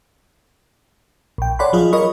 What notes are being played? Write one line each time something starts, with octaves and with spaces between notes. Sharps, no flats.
A#1 G5
A4 C#5 D5 F#5 B5 C6
F3 F#3 F4 G#4 D#5
F4 A#4 C#5 D#5 B5 C#6